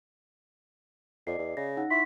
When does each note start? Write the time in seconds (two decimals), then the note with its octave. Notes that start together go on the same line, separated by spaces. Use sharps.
1.27 F2 D5 D#5 C7
1.39 E2
1.57 C#3 A#6
1.77 D#4 F#5
1.91 E4 C6 C#6 B6